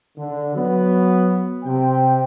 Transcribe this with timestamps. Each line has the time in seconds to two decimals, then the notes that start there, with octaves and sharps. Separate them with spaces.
0.18 D3
0.55 F#3 B3 F#4
1.64 C3 G5